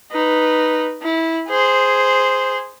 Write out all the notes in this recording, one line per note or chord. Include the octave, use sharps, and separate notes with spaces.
D#4 B4
E4
G#4 C5